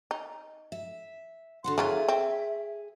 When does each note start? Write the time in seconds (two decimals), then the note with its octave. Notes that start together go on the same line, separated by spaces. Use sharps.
0.11 D#4
0.72 E5
1.64 D3 F#4 F#5 C6
1.78 E3 F#3 F4 G#4 E5
2.08 C4